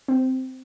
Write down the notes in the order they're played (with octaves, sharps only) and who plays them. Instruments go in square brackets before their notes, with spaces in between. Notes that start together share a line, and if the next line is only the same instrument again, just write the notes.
[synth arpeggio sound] C4